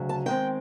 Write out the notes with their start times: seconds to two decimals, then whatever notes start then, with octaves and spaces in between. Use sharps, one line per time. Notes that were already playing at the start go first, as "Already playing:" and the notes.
Already playing: D2 C#3 F#3
0.09 A5
0.26 D#3 G#3 C4 G5